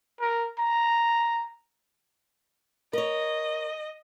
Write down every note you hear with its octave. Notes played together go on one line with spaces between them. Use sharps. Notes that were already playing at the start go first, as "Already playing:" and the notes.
A#4
A#5
A#4 C#5 D#5